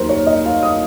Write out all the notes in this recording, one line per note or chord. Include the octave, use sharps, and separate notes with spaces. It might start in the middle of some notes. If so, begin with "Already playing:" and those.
Already playing: D#2 D#3 F#3 A#4 C5
C#5
D#5
F5
D#6